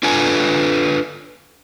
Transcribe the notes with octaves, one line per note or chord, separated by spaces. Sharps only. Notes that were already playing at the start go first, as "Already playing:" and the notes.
D4 F4 A4 B4 G#5